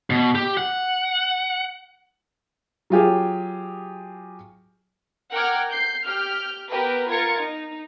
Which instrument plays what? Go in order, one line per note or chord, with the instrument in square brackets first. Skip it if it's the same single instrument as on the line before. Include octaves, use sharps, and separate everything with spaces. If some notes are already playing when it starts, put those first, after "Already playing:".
[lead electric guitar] B2
G4
F#5
[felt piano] F#3 F4 G4 G#4
[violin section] A#4 F#5 G5 D6 F6 G#6
G6 C7
G4 F6 G6
B3 G4 A#4 B4
F4 A#4 G#6 A6 C#7
D#4